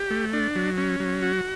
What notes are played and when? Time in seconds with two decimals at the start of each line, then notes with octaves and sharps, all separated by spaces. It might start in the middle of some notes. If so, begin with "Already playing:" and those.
Already playing: G4
0.11 A3
0.33 D4
0.55 F#3
0.78 C#4
1.00 F#3
1.22 F#4